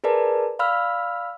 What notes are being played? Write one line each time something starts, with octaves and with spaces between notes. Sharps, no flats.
G#4 A#4 B4 D5 A5
D5 F5 B5 E6 F6